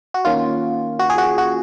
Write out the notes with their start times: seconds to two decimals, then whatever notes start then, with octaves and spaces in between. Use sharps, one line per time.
0.14 F#4
0.25 D#3 A#3 C#4 F4
0.99 F#4
1.10 G#4
1.18 F#4
1.38 F#4